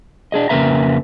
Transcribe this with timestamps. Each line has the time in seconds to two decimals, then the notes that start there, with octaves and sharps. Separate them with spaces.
0.32 D4 G#4 D#5
0.49 F2 C#3 A#3 B4 E5 A#5